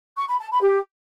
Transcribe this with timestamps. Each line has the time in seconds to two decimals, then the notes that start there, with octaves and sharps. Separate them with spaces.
0.16 C#6
0.28 B5
0.39 A5
0.50 B5
0.62 G4